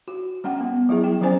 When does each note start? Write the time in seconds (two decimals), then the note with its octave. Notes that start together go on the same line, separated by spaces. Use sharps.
0.08 F#4
0.44 G3 C#4 F#5 G5
0.61 B3
0.89 F#3 G3 E4 G#4
1.04 G5
1.21 F3 F#3 C4 C#4 C5 G#5